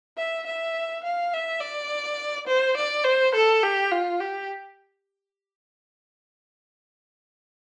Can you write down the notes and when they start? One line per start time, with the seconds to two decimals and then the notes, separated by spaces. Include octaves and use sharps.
0.18 E5
0.46 E5
1.04 F5
1.33 E5
1.61 D5
2.47 C5
2.77 D5
3.05 C5
3.34 A4
3.63 G4
3.91 F4
4.20 G4